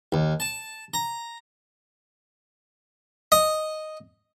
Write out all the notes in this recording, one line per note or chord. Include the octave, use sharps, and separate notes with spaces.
D#2
A5
A#5
D#5